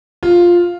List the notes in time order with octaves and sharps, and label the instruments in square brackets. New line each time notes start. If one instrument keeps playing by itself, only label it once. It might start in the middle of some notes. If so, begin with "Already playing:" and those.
[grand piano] F4